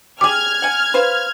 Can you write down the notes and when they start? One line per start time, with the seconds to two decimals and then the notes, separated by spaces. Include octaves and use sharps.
0.21 G4 G#4 D6 F6 G#6
0.62 F#5 G#5
0.94 B4 C5 F5